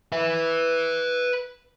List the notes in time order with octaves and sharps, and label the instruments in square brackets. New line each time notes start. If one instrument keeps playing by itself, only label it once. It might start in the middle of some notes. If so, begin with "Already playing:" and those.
[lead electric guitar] B4 E5